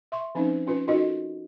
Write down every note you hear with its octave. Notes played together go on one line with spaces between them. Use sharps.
E5 C6 C#6
F3 C4 C#4 D#4
C#4 F4 B4
D#4 F4 F#4 A4 A#4 D#5